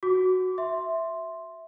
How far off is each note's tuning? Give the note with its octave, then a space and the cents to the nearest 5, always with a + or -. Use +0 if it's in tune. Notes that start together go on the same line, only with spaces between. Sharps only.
F#4 +0 D6 -25
E5 +0 C6 +0